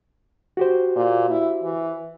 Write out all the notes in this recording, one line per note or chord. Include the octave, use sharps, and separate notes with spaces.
F#4 G4 C5
A#2
E4
E3